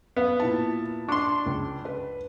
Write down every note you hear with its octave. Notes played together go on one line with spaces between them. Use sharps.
B3 F5
A#2 E4 A5
D4 C6 C#6
C#2
B4